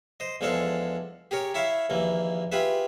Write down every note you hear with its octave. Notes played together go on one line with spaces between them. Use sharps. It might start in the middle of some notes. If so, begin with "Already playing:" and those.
C5 D#5
E2 F3 G#3 D4 A4 F5
G4 G#4 A#4 C#5
E4 C#5 E5 F5
A#1 D#2 E3 A#3
F4 G4 G#4 B4 E5